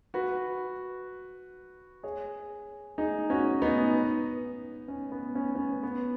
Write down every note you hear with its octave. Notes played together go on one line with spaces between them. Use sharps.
F#4 B4
G#4 C#5
D#4 G#4
C#4 F#4
B3 D#4
C#4
B3
C#4
C#4
B3
B3